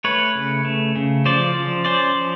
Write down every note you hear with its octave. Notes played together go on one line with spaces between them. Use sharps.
A3 B4 C#5
C#3
A3
C#3
F3 C5 D5
F3
C#4 C5 D5
F3